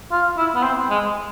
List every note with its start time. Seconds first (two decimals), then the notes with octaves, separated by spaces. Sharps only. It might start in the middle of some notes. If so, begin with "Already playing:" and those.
0.12 F4
0.38 E4
0.55 B3
0.63 C4
0.90 G#3